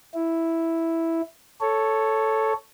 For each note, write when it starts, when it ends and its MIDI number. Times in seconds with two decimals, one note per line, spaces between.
0.14 1.21 64
1.61 2.53 69
1.61 2.53 73